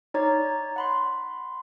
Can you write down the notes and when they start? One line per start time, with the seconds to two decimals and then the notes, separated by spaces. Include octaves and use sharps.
0.14 D#4 C#5 D5 A#5
0.76 F#5 B5 C6